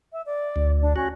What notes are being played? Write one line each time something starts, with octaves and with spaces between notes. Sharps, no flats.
E5
D5
D2
D4
C#4 F#4